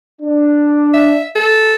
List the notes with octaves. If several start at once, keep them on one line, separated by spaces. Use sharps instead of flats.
D4
E5
A4